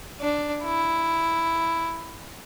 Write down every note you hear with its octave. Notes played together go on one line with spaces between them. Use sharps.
D4
E4